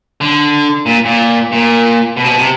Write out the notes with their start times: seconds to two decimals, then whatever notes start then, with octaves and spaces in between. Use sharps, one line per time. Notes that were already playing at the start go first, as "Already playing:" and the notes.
0.21 D3
0.86 A#2
1.05 A#2
1.52 A#2
2.17 B2
2.24 C3
2.27 B2
2.39 C3